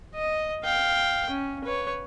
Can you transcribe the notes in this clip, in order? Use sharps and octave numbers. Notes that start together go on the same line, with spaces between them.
D#5
F5 G5
C#4
B4 C#5